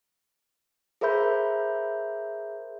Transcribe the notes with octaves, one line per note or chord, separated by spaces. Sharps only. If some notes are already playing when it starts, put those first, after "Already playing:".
G#4 A#4 C5 E5 B5 G6